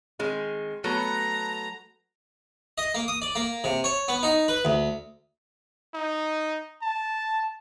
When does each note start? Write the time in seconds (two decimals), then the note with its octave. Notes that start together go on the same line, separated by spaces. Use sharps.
0.19 D#3 G#3 C4
0.84 F#3 A3 B3 A#5
2.78 D#5
2.95 A#3
3.08 D#6
3.22 D5
3.36 A#3
3.64 C3
3.84 C#5
4.08 B3
4.23 D#4
4.48 B4
4.65 D2
5.94 D#4
6.82 A5